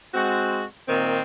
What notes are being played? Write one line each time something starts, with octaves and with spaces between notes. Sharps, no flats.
G#3 C4 F#4
A#2 D#3 C4